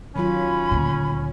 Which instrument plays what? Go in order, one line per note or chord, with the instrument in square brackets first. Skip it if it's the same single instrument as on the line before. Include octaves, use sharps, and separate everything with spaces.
[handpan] D#3 F#3 F4 [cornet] C#4 [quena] B5
[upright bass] D2 A#2